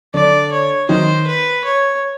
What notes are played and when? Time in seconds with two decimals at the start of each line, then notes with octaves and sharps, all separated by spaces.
0.14 D3 D4 D5
0.52 C#5
0.89 D#3 D#4 C5
1.27 B4
1.64 C#5